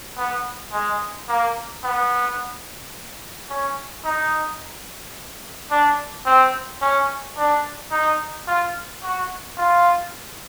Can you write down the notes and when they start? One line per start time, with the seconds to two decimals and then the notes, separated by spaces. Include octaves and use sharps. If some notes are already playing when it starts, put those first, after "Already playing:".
0.17 B3
0.73 G#3
1.28 A#3
1.84 B3
3.50 C#4
4.05 D#4
5.71 D4
6.26 C4
6.81 C#4
7.37 D4
7.91 D#4
8.47 F4
9.03 F#4
9.58 F4